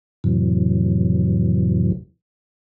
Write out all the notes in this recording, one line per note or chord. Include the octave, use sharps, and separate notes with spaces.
F2 A2 C3 E3 F#3